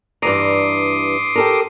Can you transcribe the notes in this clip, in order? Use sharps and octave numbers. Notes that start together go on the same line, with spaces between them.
G2 E3 A#5 C6 D6 D#6
G4 A4 A#4